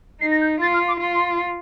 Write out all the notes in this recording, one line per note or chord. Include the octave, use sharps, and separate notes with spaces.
D#4 C7
A#6
G6
F4 A6
F6
D6
F4 C6